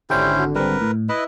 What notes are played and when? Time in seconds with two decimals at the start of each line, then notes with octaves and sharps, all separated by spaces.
0.10 G#1 D3 C#4 E4 G4 C5 G5
0.39 F#4
0.55 G3 C4 A#4 B4
0.81 A2
1.09 E4 B4 D#5